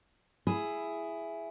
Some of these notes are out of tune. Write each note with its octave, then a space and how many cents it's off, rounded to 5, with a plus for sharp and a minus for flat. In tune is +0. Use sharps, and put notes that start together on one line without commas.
E4 +10 G#4 +0